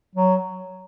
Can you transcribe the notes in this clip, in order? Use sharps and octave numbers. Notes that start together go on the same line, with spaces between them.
F#3